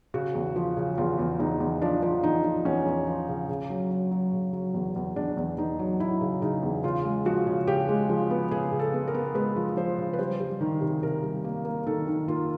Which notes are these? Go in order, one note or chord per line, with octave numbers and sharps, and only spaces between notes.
C#3 F#4
E2
F3
C#3
E2 F4
E2
E2 D#4
E2
F3 D4
F3
E2 D#4
F3
E2 C#4
E2
F3
C#3
C#3
F#3
F#3
F#3
C#3
F#3
E2
E2
E2 D4
E2
E2 D#4
F#3
F#3 E4
C#3
C#3 D#4
E2
C#3 F4
G#3
F3 F#4
C#3
C#3 G4
G#3
F3
B3
C#3 G#4
C#3
A4
B3
A#4
B3
G#3 B4
F3
F3 C5
C#3
B4
G3 C5
G3
D#3
C3
C3 A#4
G3
A#3
A#3
D#3 A4
D#3
A#3 F4